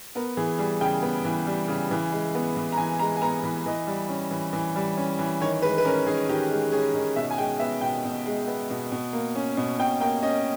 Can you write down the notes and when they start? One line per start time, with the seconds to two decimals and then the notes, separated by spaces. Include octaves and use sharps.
0.15 B3 A#4
0.37 E3 G#4
0.58 G3 G#4
0.81 C#3 G5
1.02 B3
1.25 E3
1.47 G3
1.68 C#3
1.91 E3
2.12 G#3
2.35 B3
2.57 E3
2.72 A#5
2.78 E3 G#5
2.99 G#3 A#5
3.17 G#5
3.22 B3 A#5
3.44 E3 B5
3.66 E3 D#5
3.87 G3
4.09 C#4
4.31 E3
4.53 E3
4.76 G3
4.97 C#4
5.19 E3
5.41 D#3 C#5
5.62 G#3 B4
5.78 B4
5.85 C#4 A#4
6.07 D#3 G#4
6.29 D#3 G4
6.51 G#3
6.72 C#4 G#4
6.94 D#3
7.16 B2 E5
7.31 G#5
7.38 G#3 G5
7.59 B3 E5
7.81 B2 G5
8.04 B2
8.26 G#3
8.48 B3
8.70 B2
8.92 B2
9.13 A#3
9.35 C#4
9.57 B2
9.79 B2 G5
10.00 A#3 G5
10.22 C#4 D#5